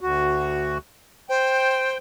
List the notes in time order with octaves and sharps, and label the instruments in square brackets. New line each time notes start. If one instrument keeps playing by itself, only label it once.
[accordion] D2 F#4
[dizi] C5 [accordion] G5